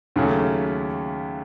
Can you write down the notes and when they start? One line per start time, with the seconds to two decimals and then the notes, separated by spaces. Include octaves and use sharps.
0.16 D#2 C#3 F#3 A3 C#4